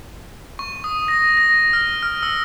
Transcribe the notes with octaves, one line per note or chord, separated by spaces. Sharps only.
C#6
D#6
A#6
A#6
F6
F6
E6